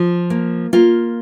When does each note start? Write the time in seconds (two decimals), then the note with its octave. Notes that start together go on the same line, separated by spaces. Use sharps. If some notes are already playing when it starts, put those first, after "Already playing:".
Already playing: F3
0.30 A#3
0.73 A#3 F4